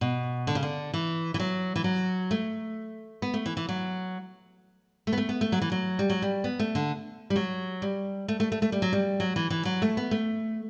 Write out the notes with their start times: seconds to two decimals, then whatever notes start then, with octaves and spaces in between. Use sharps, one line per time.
0.01 B2
0.47 D3
0.55 C#3
0.63 D3
0.94 E3
1.34 E3
1.39 F#3
1.76 E3
1.84 F#3
2.31 A3
3.22 B3
3.34 A3
3.46 E3
3.57 E3
3.69 F#3
5.07 A3
5.13 B3
5.18 A3
5.29 B3
5.41 A3
5.52 F#3
5.62 E3
5.72 F#3
5.99 G3
6.10 F#3
6.22 G3
6.44 B3
6.59 A3
6.75 D3
7.30 G3
7.36 F#3
7.82 G3
8.28 A3
8.40 A3
8.52 A3
8.62 A3
8.72 G3
8.82 F#3
8.93 G3
9.20 F#3
9.36 E3
9.50 E3
9.65 F#3
9.82 A3
9.97 B3
10.11 A3